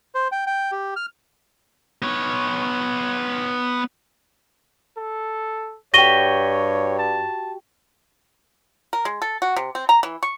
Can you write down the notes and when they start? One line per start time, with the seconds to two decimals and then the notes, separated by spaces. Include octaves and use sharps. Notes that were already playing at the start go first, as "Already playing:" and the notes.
0.15 C5
0.32 G5
0.47 G5
0.72 G4
0.96 F6
2.02 B3 C#5
4.97 A4
5.94 G2 F#4 G4 C#5 A#6 D#7 G7
6.99 A5
8.93 A#4
9.05 G#3
9.22 A4
9.42 F#4
9.56 C3
9.75 C4
9.89 A#5
10.03 E3
10.23 C#6